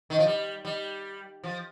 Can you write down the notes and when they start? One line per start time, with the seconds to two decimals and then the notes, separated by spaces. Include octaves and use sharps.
0.10 D#3
0.19 F3
0.26 G3
0.65 G3
1.44 F3